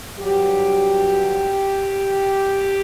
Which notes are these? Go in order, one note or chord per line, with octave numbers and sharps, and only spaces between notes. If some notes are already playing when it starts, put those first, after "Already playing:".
G2 F#3 G4